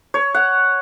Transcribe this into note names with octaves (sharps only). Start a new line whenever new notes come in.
C#5
F#5